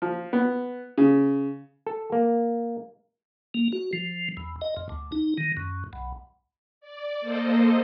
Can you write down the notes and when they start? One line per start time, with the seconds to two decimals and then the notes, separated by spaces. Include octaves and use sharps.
0.02 F3
0.33 B3
0.98 C#3
1.87 A4
2.12 A#3
3.54 A#3
3.72 F#4
3.93 F3
4.37 E2
4.61 D#5
4.77 F2
4.89 D2
5.12 D#4
5.38 D#3
5.57 F#2
5.93 B1
6.81 D5
7.21 A#3 A4 C5 D#5